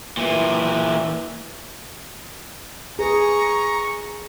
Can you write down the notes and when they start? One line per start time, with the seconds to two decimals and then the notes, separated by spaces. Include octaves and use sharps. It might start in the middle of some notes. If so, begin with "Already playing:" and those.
0.17 A#2 E3
2.99 G#4 B4 G#5 A#5 C#6